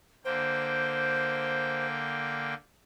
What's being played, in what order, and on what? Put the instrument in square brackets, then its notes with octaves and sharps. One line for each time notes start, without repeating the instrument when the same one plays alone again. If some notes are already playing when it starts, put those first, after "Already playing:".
[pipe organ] D3 A#3 G5 [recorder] C5